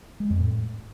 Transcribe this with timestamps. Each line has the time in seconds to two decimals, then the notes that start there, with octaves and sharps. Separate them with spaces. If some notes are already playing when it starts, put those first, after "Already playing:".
0.20 G#3
0.30 F2
0.40 A2